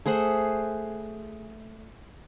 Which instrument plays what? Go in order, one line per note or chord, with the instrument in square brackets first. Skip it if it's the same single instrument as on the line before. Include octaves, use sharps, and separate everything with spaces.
[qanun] A3 G#4 C5 F#5